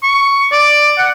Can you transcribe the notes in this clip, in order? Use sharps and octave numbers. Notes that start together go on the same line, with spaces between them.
C#6
D5
F#5